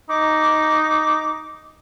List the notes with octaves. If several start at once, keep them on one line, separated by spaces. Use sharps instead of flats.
D#4 D6